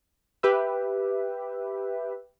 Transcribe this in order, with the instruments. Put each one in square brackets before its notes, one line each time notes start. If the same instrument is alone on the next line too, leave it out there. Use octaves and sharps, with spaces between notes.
[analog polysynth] G4 B4 E5